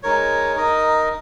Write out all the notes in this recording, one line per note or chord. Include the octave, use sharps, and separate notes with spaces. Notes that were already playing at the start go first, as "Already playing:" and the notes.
G#3 D#4 A#4 C#5
D#4 A#4 D#5